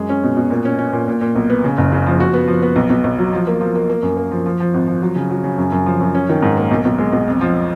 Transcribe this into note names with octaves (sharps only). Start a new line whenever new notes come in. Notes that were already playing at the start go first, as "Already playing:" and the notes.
Already playing: F#2 G#3
C#4
B2
B2
A#2
C#4
C#4
A#2
A#2
A#2
B1
B3
C#3
F#1
C#3
F3
F#4
B3
F3
B3
B1
B1
B1
F#3
F3
A#3
F3
A#3
A#3
F#2
A#3
F3
F3
F3
G#1
F3
F#3
C#3
F#3
C#3
F#2
F#2
F3
F#2
C#4
D#3
G#2
A#3
B1
B1
G#3
B1
F2
F3